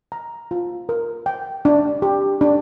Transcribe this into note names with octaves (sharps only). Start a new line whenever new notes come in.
A#5
F4
A#4
G5
D4
G4
D4